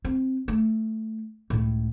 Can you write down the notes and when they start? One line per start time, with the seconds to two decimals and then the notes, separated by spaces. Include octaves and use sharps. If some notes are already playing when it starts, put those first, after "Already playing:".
0.05 C4
0.48 A3
1.50 C#2 A2